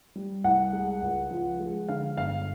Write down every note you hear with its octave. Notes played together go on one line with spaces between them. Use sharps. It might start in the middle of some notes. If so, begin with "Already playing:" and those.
G3
C2 F#5
G#3
C#2
F3
G#3
D3 F5
G1 F5